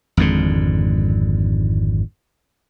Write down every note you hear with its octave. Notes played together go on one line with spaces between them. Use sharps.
G#1 F2 G#2 D3